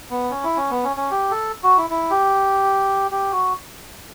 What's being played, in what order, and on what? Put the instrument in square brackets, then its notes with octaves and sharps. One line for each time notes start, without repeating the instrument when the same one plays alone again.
[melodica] B3
C#4
E4
C#4
B3
C#4
C#4
G4
A4
F#4
E4
E4
G4
G4
F#4